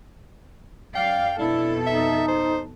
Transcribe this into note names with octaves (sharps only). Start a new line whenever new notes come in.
F#2 D5 F5 G5
F2 B2 D4 E4 A4
D#4 E5
C5